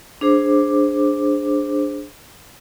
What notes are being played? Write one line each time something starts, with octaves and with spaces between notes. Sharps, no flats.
D4 G#4 C5 D6